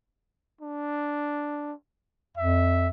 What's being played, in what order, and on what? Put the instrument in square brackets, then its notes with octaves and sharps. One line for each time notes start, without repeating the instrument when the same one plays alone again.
[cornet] D4
[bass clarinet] F2 [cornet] E5